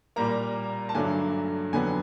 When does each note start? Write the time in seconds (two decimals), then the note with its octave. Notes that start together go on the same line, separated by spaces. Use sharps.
0.16 A#2 G3 A#3 A#5
0.89 A5
0.95 G2 D3 F#3 A3 G#5
1.73 F2 D3 F#3 B3 G#5